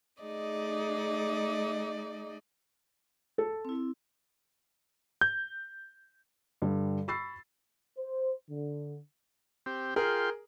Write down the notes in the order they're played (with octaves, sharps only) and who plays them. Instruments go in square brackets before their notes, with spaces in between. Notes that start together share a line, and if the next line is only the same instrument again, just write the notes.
[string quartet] A3 D#4 G#4 D5 D#5
[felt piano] A4
[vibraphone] C4 E4
[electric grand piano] G6
[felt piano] G2 D3 G3
B5 C#6 E6 A6 C7
[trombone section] C5
D3
[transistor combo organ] C4 G4
[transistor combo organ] F4 G5 C6 [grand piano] G#4 A#4